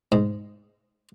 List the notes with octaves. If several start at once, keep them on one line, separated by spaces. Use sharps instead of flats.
G#2